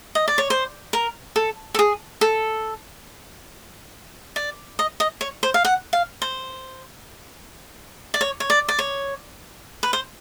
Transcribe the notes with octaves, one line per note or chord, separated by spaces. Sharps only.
D#5
D5
C#5
C5
A#4
A4
A4
G#4
A4
D5
D#5
D#5
C#5
C5
F5
F#5
F5
C5
D5
C#5
C#5
D5
D5
C#5
B4
C5